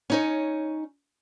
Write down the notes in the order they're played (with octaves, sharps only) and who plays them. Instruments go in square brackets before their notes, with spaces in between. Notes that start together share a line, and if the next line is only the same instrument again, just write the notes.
[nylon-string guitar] C#4 D#4 C#5